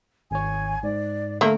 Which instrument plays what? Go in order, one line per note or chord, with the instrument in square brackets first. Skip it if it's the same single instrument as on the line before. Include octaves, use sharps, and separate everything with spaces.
[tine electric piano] G#1 C#5 [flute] G#5
[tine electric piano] G#2 [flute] D5
[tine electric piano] D3 [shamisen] A3 A#3 [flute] F5